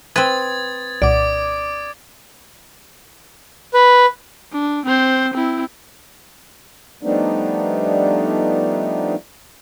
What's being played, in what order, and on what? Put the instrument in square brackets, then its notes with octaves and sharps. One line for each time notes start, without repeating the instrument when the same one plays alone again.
[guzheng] C4 B4 [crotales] D#6 G#6 A6
[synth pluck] C2 A#2 F#5 [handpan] D5 [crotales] D6 D7
[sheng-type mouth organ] B4
[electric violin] D4
C4 C5
C4 E4
[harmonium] F3 G3 A3 B3 D4 D#4